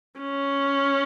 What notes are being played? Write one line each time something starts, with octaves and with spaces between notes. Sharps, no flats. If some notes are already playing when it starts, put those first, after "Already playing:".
C#4